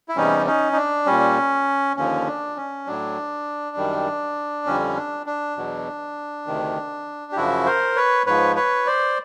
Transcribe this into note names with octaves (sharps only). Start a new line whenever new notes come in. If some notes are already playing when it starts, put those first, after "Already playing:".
E4
E2 C3 E3 G3 C#4 D#4
C#4 D#4
D#4
D4
A#2 G3 C#4
D#2 D3 F3 C#4
D4
C#4
A2 F#3 D4
F#2 D#3 G3
F2 D3 G3 C#4
D4
D4
E2 B2 F#3
D2 C3 D#3
G4
F#2 C#3 F3 E4 F#4
A#4 C5
B4 C#5
G#2 F3 B4 C#5
B4 C#5
C5 D5